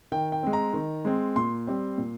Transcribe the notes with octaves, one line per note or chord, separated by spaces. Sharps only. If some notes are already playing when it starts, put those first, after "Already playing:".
D#3 G5
G5
G#3 C4
A#5
D#3
G#3 C4
A#2 C6
G3 C4
A#2